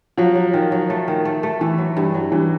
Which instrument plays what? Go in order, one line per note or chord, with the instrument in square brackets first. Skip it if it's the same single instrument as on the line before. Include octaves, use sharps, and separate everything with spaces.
[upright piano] F3 [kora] F#3
[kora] F#3
D#3
F#3
A3
D#3
A3
A3
[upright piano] E3 [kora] A3
[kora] F#3
G2
F#3
[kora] G2 [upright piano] E3